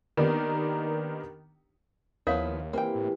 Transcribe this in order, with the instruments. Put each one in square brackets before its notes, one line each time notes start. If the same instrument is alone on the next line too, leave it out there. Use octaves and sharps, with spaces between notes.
[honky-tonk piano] D#3 A#3 B3 D4 D#4 G4
[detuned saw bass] D#2 [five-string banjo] F3 B3 E4 [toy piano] A#4 C#5 F5
[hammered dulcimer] C3 E3 [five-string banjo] A#3 G5
[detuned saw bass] A2